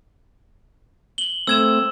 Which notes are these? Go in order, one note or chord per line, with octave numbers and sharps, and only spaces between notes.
F#7 G7
A3 C4 E6 G#6 E7